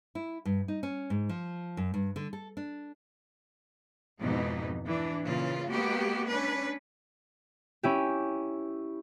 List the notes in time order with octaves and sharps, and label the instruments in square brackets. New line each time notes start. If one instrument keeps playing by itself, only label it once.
[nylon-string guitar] E4
G2
D#4
C#4
G#2
F3
F#2
G2
D3
A4
D4
[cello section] F2 G#2 B2 E3 B3 D#4
E3 D4
A#2 C#3 E3 F4
G#3 A#3 B3 F#4 G4
C#4 D4 B4
[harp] C#4 E4 G4